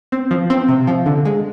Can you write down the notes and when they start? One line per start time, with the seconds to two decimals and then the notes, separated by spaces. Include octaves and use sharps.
0.12 C4
0.31 F3
0.50 C4
0.69 C3
0.87 F3
1.06 D3
1.25 G#3